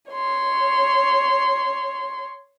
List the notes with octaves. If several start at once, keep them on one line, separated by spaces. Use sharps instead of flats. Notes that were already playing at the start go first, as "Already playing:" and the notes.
C#5 C6